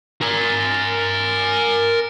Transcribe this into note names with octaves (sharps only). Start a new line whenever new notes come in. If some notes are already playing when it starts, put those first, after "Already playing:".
A#4 G#5